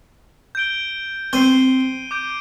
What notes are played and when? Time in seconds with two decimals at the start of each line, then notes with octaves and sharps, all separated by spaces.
0.55 G6 D7 G7
1.33 C4 G6 C7 D#7 G7
2.11 D6 G6 D7 G7